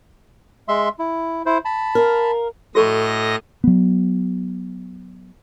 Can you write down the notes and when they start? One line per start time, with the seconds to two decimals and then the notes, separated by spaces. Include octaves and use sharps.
0.68 G#3 E5 C6
0.99 E4
1.46 E4 C5
1.65 A5 B5
1.95 A#4 F5
2.75 A2 F#4 A4 D#5 C#6 A#6
3.64 F#3 B3